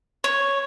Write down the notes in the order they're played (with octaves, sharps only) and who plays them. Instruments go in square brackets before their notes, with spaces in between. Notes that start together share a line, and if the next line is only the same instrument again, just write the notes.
[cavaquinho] C#5